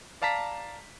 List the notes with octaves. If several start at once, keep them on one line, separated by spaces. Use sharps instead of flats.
D5 F5 A5 A#5 B6